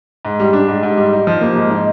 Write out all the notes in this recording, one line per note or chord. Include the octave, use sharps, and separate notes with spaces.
G#2
G3
D4
G#2
G#2
G3
D#4
F3
A#3
G#2
D#4